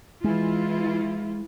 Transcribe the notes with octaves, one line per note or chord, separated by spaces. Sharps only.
E3 G#3 E4 F4